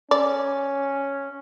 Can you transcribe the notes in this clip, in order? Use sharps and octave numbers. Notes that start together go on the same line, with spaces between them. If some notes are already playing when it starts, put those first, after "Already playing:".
C#4 D5